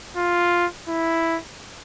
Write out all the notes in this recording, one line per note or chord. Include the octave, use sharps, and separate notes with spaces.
F4
E4